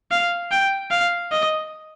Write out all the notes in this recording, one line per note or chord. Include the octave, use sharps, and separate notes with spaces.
F5
G5
F5
D#5